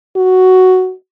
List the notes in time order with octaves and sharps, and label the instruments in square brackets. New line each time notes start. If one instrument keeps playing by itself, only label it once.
[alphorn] F#4